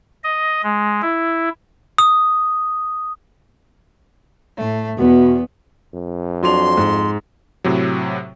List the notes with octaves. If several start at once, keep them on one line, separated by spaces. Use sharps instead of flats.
D#5
G#3
E4
D#6
A2 A3
E2 B2 B3 F#4
F2
F#3 D4 C6 F7
G#2
A2 C3 F#3